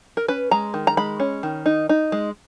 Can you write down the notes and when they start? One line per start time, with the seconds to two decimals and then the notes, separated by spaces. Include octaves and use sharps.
0.17 A#4
0.28 C#4 B4
0.51 G#3 A#5
0.74 D#3
0.87 A#5
0.97 G#3 B5
1.20 C#4
1.43 D#3
1.66 D#4
1.89 D#4
2.12 G#3